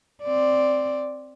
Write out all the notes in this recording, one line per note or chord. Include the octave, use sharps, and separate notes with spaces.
C4 D5